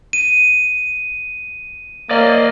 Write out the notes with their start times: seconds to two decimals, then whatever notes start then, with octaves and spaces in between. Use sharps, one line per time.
0.13 D#7
2.11 A#3 D5 D#5